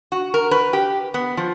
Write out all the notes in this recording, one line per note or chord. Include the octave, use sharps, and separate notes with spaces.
F#4
A#4
B4
G4
B3
F3